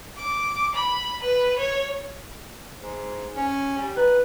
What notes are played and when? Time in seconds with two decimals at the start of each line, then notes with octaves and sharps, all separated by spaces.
0.17 D6
0.75 B5
1.23 B4
1.58 C#5
2.80 G#2
3.36 C#4
3.77 G3
3.96 D#4 B4